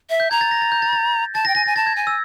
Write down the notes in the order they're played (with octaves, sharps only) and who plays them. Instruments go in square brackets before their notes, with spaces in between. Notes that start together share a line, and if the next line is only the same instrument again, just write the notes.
[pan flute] E5
[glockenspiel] G6
[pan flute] A#5 [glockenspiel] G#6
[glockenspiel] A6
A#6
A6
G6
A6
A6
[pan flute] A5 [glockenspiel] A6
[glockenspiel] A#6
[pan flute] G5
[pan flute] G#5 [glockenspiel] A#6
[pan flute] G#5 [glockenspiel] A6
[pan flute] A5 [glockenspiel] A6
[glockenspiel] G#6
[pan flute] G#5
[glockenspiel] E6